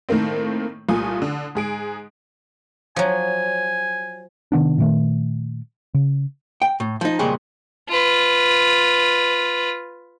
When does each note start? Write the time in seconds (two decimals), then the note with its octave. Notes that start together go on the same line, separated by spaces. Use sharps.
0.09 A2 D#3 A3 A#3 C4
0.89 C2 A#2 A3 F4 G#5 D#6
1.22 D3
1.55 G#2 G#4 D7
2.96 F3 F#3 G#5
4.52 C3 D#3 B3 D4
4.78 A#2 D#3 A3
5.94 C#3
6.62 G5
6.80 A2
7.01 F3 D#4
7.19 F2 A#2 C#3 G3 G#3
7.89 F4 B4